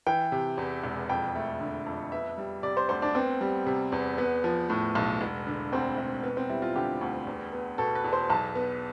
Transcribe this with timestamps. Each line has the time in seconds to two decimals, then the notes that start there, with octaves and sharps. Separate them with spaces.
0.07 E3 G5
0.32 C3
0.58 E2
0.84 E1
1.09 F2 G5
1.35 A3
1.61 D3
1.86 F2
2.12 B3 E5
2.38 G3
2.63 C3 D5
2.77 C5
2.89 D2 C5
3.02 D4
3.15 B3 C4
3.41 G3
3.66 C3
3.92 E2
4.18 B3
4.44 F3
4.70 A2
4.95 B1
5.21 E1
5.47 D3
5.72 D2 C4
5.98 E1
6.23 B3
6.37 C4
6.49 G3 E4
6.62 F4
6.76 D3 G4
7.01 D2
7.27 E2
7.53 B3
7.78 B2 A4
7.95 B4
8.04 E2
8.13 C5
8.30 B1 A5
8.55 B3